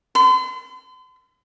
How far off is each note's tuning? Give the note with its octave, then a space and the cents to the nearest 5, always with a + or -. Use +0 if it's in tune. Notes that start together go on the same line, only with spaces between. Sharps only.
C6 -45